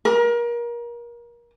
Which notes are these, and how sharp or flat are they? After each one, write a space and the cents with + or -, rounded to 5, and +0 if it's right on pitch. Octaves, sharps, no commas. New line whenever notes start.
A#4 +30